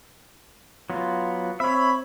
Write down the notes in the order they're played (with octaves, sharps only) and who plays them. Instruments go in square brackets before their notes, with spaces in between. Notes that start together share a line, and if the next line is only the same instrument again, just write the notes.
[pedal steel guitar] F#3 B3 F4
[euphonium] C4 [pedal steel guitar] C#5 E5 [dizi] B5